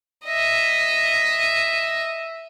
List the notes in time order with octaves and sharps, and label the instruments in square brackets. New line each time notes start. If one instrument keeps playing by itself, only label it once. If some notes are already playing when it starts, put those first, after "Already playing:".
[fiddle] D#5 E5